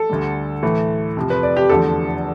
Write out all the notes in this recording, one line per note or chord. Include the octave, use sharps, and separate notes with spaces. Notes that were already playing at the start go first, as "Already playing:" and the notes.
Already playing: A4
D2 D3 G3
A2 E3 A3
F2 C3 F3
B4
D5
G4
E2 D3 F3 A3 A4